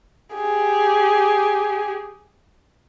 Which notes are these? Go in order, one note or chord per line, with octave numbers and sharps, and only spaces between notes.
G4 G#4